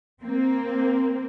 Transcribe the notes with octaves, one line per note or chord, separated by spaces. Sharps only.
A#3 C4